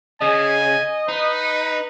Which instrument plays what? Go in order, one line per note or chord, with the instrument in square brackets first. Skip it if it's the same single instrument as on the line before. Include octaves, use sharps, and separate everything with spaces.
[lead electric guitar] C#3 [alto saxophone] D#5 [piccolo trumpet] G#5
[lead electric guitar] D#4 [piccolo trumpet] B4